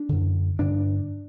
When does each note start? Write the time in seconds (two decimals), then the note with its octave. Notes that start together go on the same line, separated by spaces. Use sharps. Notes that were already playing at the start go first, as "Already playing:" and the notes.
Already playing: D4
0.09 F#2 D3
0.59 G2 D3 D4